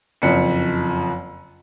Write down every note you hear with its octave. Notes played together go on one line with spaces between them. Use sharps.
F#1 F2 C#7